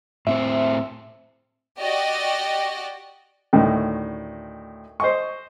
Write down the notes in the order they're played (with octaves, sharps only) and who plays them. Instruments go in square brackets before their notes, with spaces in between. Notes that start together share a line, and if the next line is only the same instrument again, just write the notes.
[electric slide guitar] A2 C4 C5 [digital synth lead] E5
[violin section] F#4 G4 D5 D#5
[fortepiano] D2 A2 D#3
C5 D#5 C#6